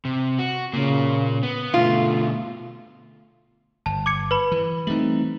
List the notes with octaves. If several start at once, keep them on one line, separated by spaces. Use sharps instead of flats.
C3
F#4
A#2 C#3 A#3
B3
B2 D3 A3 F4
G1 A5
D6 G#6 C#7
B4 B5
E3
E3 G3 A3 C4 D#4 F#7